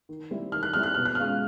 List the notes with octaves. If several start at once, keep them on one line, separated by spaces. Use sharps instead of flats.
D#3
G3 C4 E4
D#3 F6
F#6
G3 C4 E4 F6
F#6
B2 F6
F#6
G#3 C#4 F4 F6